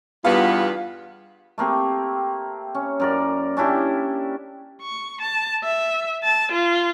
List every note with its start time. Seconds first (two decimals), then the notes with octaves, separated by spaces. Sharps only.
0.25 E2 G2 G3 B3 F4 F5
1.58 A3 A#3 C4 G4
2.75 C#4
3.00 F#2 A#4 D5
3.57 C#4 D4 E4 G4
4.82 C#6
5.22 A5
5.64 E5
6.24 A5
6.52 F4